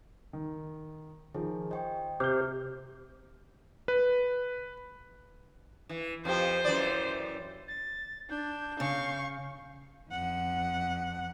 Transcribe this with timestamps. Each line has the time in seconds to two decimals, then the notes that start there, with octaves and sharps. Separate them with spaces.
0.33 D#3
1.35 D#3 F3 G#4
1.71 C5 D#5 G5 C#6
2.20 C3 G4 C5 F6 G7
3.88 B4
5.89 E3
6.25 F2 F3 G4 C5
6.64 F#2 E3 D5
7.67 A6
8.30 D4 G6
8.80 C#3 F5 C#6
10.10 F2 F#5